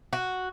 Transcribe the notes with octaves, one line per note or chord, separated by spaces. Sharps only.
F#4